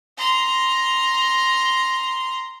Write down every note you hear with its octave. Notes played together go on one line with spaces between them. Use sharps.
A#5 C6